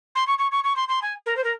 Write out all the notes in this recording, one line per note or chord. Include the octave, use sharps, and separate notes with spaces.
C6
C#6
C#6
C#6
C#6
C6
C6
G#5
A#4
C5
A#4